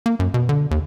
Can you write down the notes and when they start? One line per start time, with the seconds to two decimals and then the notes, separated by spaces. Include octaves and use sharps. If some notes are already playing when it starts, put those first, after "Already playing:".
0.06 A#3
0.19 F#2
0.34 B2
0.49 D3
0.71 D#2